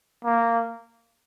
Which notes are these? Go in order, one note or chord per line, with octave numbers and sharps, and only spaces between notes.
A#3